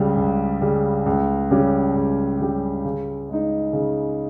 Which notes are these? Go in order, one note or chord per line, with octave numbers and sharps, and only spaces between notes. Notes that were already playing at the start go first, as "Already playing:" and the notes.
Already playing: C#2 C#3 G3
C#2
C#3 G3
C#2
C#3 G3 C#4 G4
C#2
C#3 G3 C#4 G4
C#3
G#3 D#4
C#3